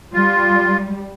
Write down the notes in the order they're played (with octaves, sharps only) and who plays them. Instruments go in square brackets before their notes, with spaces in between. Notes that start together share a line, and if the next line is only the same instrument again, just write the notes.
[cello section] G3 [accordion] F4